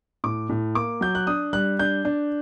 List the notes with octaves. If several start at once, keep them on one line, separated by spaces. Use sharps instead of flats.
A2 D6
A2
A#3 D6
F#3 G6
F#6
D4 D#6
G3 F#6
D4 G6
D4